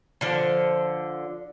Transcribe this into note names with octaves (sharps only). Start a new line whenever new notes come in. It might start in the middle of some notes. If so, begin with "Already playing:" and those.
D3 F3